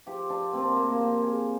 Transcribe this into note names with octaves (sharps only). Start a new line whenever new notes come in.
F3 G4
F3 D4
A#2 C4
D4
C4
F3 A#3
A#3
F3 C4
F3 G#4